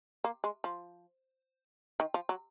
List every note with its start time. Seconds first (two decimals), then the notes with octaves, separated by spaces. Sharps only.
0.24 A#3
0.44 G#3
0.64 F3
2.00 D#3
2.14 F3
2.29 F#3